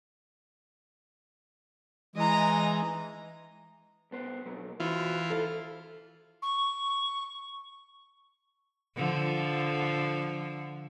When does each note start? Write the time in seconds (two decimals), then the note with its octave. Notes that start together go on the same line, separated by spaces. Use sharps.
2.16 E3 G#3 D#5 A#5
4.11 C2 B3 C5
4.45 B2 F#3 A#3
4.80 B2 E3 F4 F#4 C5
5.30 A4 C5
6.42 C#6
8.97 D3 F3